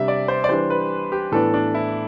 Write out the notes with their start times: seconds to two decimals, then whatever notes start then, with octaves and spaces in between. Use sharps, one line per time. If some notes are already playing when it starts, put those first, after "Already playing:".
Already playing: C3 G3 D4 E5
0.08 D5
0.28 C5
0.44 D5
0.49 E3 G3 D4 C5
0.70 B4
1.12 G4
1.32 A2 E3 B3 D4 A4
1.54 D4
1.75 E4